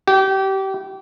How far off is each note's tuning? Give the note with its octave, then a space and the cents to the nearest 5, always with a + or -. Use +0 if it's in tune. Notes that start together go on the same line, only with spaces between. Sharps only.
G4 -25